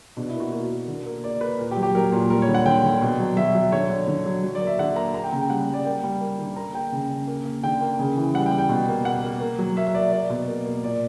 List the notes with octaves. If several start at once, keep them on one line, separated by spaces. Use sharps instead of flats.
B2 D4
E4
A#3
F#4
A#3 F#4
A#3
D3
A#3
A#3 D5
A#3 B4
A#2 A#4
G4
F#3
G4
F#3 A#4
A#2
G3 A#4
C#5
D3
F#5
D3 G5
D3
B2
F#3
F#3 E5
F#3
D3 C#5
D3
D3
F#3
F#3
D5
A#3
E5
D3 F#5
A#3 A#5
A#3 A#5
G5
C#3 A#5
G5
G3 F#5
G3
D5
A#3 G5
G3
A#3
D3
A#3 A#5
A#3 G5
C#3
C#3
A#3
A#3
D3 G5
A#3
C#3
E3
G3 F#5
G5
G3
G5
B2
A#3
A#3 F#5
A#3
A#3
F#3
A#3 E5
E5
A#3 D5
A#3 D5
B2
A#3
A#3
A#2 D5